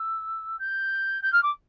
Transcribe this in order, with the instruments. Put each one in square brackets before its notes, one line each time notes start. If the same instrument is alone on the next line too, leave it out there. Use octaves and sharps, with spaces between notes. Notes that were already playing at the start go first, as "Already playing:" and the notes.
Already playing: [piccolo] E6
G6
G6
F6
D6